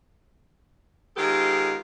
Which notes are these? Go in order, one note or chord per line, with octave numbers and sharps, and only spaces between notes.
D#3 G#3 B3 F4 G4 A4